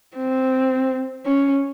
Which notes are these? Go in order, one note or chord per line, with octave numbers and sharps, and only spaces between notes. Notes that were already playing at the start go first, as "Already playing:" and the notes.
C4
C#4